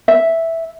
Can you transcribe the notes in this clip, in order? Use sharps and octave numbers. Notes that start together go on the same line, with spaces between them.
E5